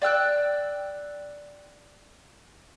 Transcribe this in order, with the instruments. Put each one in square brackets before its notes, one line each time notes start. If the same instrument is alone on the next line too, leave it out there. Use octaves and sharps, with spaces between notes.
[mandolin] D5 G5 E6 F#6